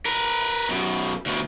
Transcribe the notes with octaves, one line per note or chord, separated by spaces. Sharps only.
A#4 B4
F#2 B2
D2 B2